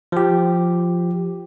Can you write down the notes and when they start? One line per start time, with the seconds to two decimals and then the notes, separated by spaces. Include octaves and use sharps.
0.12 F3 G4